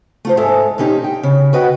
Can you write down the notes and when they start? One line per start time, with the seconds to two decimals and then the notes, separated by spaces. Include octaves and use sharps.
0.25 A3 F4 C5
0.37 G#2 G#3 A4 E5
0.78 A#2 A#3 C#4 D#4 G4
1.04 G5
1.23 C#3
1.53 F#4 B4 D#5 F#5 G5